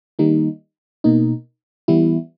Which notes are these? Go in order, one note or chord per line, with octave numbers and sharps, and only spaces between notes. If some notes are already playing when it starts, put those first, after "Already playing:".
D#3 G3 A#3 D#4
B2 A#3 D#4
E3 G3 B3 E4